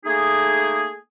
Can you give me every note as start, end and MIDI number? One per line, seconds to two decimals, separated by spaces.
0.05 0.93 57
0.05 0.93 58
0.05 0.93 63
0.05 0.93 68